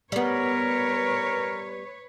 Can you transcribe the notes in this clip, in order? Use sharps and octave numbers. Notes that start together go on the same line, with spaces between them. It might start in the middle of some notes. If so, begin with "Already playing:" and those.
G3 B3 A#4 B4 C#5